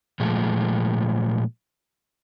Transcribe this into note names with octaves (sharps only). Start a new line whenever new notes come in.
A#2 F3 G#3 A3